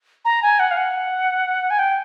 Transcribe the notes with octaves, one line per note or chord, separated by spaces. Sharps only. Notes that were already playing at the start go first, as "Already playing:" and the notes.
A#5
G#5
F#5
F5
F#5
G#5
G5